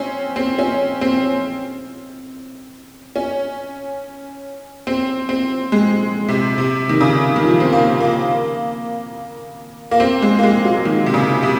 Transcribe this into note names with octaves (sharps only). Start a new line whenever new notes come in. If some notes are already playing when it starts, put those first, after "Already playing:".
Already playing: C4 C#4
C4
C#4
C4
C#4
C4
C4
G#3
C3
C3
D#3
C#3
D#3
F3
C4
A#3
A#3
A#3
C4
G#3
A#3
G#3
F#3
D#3
C3
C#3
C3